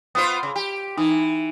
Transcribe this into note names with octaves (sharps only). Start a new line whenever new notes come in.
B3 F4 C5 D#6
C#3
G4
E3 D#4